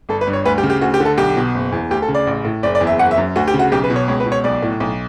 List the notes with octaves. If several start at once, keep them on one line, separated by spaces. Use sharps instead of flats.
G1 A4
B4
G2
C#5
D2 B4
G4
C#3
G4
D2 F#4
G4
D3
A4
B1 G4
B2
F#1
E2
D2 G4
A4
C#3
D5
A1
A2
F#1 D5
D5
E2
E5
F#1 F#5
E5
F#2
D2 F#4
G4
C#3
F#4
B1 G4
B4
B2
C#5
C#2 C#5
B4
B2
C#5
B1 D5
A2
B1